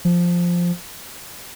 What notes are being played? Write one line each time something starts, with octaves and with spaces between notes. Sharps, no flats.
F3